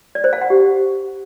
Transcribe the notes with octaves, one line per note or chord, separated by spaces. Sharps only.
D5
C5
F5
F#5
G4